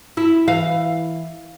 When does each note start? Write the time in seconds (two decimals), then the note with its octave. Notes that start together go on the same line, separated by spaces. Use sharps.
0.17 E4
0.48 E3 F5